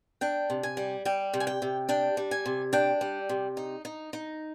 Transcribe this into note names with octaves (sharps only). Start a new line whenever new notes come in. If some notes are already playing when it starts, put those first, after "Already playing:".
D4 G5
C3
G#5
G3
G3 G5
C3
G#5
G5
C3
D4 G5
G3
G#5
C3
D4 G5
G3
C3
D#4
D#4
D#4